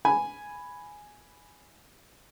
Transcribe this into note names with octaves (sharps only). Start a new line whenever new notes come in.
G#5 B5